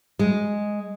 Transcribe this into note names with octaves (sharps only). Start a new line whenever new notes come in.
G#3